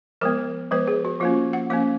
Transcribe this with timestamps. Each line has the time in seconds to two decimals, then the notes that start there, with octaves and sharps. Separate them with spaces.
0.21 F3 G#3 B3 A#4
0.71 F3 G#3 B3 B4
0.88 G#4
1.05 F#4
1.20 F3 A#3 C#4 F4
1.53 F#5
1.70 F3 A#3 C#4 F5